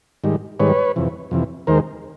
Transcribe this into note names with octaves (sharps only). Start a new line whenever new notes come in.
G#2 D#3 G3
G#2 D#3 G3 B4 C#5
F2 C3 E3
F2 C3 E3
D#2 D#3 G#3 A#4 C5